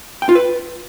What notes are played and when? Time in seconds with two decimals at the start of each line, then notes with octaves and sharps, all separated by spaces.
0.22 G5
0.29 F4
0.35 B4